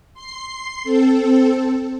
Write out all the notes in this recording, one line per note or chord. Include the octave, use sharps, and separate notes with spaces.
C6 C7
C4 A4